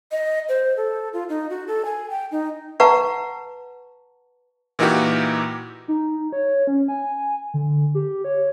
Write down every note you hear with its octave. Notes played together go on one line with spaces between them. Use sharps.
D#5
C5
A4
F4
D#4
F#4
A4
G#5
G5
D#4
B4 F5 F#5 A5 A#5 C#6
A#2 E3 A#3 D#4 F#4 G4
D#4
C#5
C#4
G#5
D3
G4
C#5